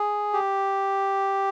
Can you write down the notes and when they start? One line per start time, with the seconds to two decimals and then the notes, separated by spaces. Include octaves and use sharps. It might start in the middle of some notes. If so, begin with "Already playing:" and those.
Already playing: G#4
0.33 G4